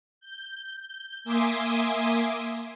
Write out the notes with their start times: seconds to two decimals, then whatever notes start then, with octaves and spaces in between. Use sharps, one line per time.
0.20 G6
1.24 A#3 E5 G#5 C6 D6 D#6